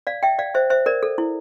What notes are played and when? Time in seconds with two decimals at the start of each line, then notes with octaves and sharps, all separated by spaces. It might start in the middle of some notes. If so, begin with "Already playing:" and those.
0.07 D5 F5
0.23 E5 G5
0.39 D5 F5
0.55 C5 E5
0.70 C5 E5
0.86 A#4 D5
1.03 A4
1.18 E4